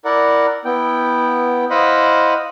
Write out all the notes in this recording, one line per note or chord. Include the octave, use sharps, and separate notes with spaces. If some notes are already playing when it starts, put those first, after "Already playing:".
E4 A#4 D5 F#5
B3 E4 G5
E4 C5 D#5 F5 F#5 B5